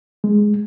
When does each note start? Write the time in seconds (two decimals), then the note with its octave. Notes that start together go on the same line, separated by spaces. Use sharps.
0.24 G#3